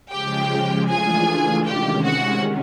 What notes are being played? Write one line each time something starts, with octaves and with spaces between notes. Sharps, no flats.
C#3 F3 G#3 G4 G5
E3 A3 D4 F4 G#4 G#5
C3 D#3 G#3 C#4 G4 G5
F#4 F#5